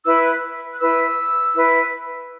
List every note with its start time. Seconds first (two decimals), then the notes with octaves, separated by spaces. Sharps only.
0.05 E4 B4 E6
0.23 F#6
0.74 F#6
0.80 E4 B4 E6
1.54 E4 B4